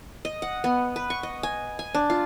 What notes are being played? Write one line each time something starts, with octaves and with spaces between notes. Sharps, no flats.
D#5
F#5
B3
B4
C#6
D#5
G#5
G#5
D4
F4